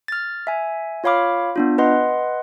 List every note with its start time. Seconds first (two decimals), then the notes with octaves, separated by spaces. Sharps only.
0.08 F6 A6
0.47 E5 G#5
1.04 F4 C#5 F5 B5 D6 F6
1.56 B3 D4 F4
1.78 B4 D#5 F#5 C6